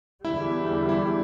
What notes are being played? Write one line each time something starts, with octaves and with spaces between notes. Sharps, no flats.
E2 D3 G3 E4 E5
E4 E5